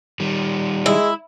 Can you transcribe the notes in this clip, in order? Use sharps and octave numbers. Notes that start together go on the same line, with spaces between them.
D#3 G3
G#3 E4